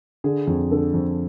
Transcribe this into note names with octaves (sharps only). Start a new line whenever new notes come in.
D3 G#4
F2
D3 A4
F2